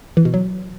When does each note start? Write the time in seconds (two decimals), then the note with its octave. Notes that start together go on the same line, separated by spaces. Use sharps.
0.17 E3
0.25 B2
0.34 F#3